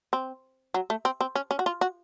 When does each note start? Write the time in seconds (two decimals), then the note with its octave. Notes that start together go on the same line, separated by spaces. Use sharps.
0.13 C4
0.74 F#3
0.90 A3
1.05 C4
1.21 C4
1.35 C#4
1.51 C#4
1.59 F#4
1.66 F4
1.81 F#4